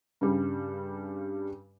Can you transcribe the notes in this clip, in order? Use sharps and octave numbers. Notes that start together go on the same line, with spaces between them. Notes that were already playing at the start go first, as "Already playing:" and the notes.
G2 C#3 G3